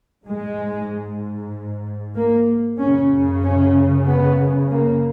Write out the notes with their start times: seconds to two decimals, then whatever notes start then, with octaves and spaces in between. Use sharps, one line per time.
0.25 G#2 G#3
2.15 A#3
2.79 F#2 C#3 C#4
3.43 C#4
4.07 B3
4.70 A#3